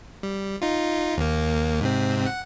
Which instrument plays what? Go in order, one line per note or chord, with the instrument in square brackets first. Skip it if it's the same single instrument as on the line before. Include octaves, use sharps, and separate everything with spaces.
[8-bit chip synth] G3
D#4 F4
D#2 A#3
G#2 C3 C4
F#5